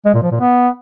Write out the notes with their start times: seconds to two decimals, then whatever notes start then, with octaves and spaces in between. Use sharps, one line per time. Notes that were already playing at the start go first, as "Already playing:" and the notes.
0.05 G#3
0.14 A#2
0.23 F3
0.31 A#2
0.40 B3